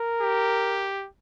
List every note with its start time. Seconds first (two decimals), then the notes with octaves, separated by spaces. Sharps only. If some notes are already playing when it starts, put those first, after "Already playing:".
Already playing: A#4
0.21 G4